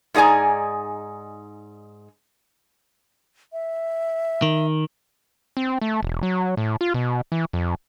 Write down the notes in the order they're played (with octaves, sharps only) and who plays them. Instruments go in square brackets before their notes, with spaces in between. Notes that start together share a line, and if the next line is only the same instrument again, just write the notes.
[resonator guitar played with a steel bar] G#2 D#4 G#4 D5 G#5 A#5
[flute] E5
[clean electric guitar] D#3
[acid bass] C4
A3
E1
F#3
A2
F4
B2
E3
F2